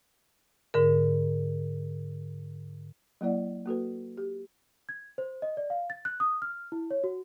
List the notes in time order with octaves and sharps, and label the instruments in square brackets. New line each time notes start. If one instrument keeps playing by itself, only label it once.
[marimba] G#2 D3 A#4
[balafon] F#3 A#3 E4 D5 F#5
A#3 F#4 A4 B4
G4
[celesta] G#6
C5
D#5
D5
F5
A6
F#6
D#6
F6
E4
C#5
F#4